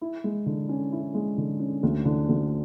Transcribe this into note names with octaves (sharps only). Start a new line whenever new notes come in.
E4
G#3
D3
C#4
E4
G#3
D3
C#4
D2
D3
D2